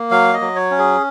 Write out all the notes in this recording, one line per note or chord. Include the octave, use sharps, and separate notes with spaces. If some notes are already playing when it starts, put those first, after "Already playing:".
Already playing: A#3
F#3 F5
D#5
F#3
C#5
C#4
G#4